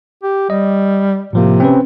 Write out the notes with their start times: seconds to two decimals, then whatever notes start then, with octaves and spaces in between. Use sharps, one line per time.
0.23 G4
0.50 G3 D#5
1.33 A2 C3 F3 A#3
1.60 C4 C#4 B4